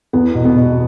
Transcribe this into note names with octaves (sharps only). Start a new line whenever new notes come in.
E2 B3
B2
B3
B2